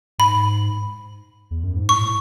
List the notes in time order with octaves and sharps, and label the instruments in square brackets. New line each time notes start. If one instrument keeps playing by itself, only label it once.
[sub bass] G#2 [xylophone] B5
[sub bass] E2
F#2
G#2
[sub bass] A2 [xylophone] C#6
[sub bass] A2